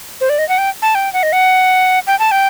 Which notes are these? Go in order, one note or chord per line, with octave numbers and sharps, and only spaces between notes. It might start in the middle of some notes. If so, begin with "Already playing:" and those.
C5
D5
D#5
F#5
G5
A5
G5
F#5
D#5
F#5
G5
A5
G5